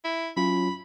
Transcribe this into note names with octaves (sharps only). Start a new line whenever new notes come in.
E4
F#3 C#4 F4 B5